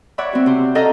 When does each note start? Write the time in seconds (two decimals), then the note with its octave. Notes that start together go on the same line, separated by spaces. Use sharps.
0.18 C#5 D5 E5 F#5 B5
0.33 C4 F#4
0.46 C3 C5
0.75 C#4 A4 D#5 F5 F#5 A#5